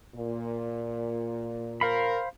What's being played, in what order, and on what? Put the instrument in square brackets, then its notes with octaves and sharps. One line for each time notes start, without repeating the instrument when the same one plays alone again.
[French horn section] A#2
[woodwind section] A#4 [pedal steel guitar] C5 F5 B5